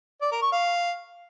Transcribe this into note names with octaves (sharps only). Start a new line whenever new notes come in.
D5
A#4
C#6
F5